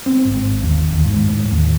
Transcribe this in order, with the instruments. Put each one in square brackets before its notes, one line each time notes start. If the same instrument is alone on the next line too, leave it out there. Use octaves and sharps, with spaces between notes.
[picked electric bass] C4
G#1
D#2
D#2
G#2
A2
D#2